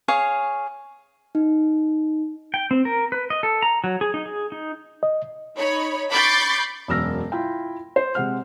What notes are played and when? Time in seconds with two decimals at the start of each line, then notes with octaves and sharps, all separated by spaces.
0.08 G#4 C#5 F5 C#6
1.35 D#4
2.54 G5
2.71 C4
2.85 A#4
3.12 B4
3.30 D#5
3.43 A4
3.63 A#5
3.84 F#3
4.01 G#4
4.14 D#4
4.25 G#4
4.52 D#4
5.03 D#5
5.58 D#4 C#5 B5
6.10 B5 C#6 D6 G6 A6 C7
6.88 E1 F#2 E6 F6 A#6
7.32 E4 F4 G5
7.96 C5
8.15 C3 G#3 F#5 F6